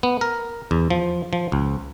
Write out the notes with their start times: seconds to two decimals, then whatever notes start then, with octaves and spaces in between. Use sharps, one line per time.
0.03 B3
0.21 A#4
0.71 E2
0.90 F3
1.33 F3
1.52 C#2